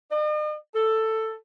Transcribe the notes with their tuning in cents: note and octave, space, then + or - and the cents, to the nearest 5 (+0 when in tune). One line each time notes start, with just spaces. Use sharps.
D#5 -45
A4 +10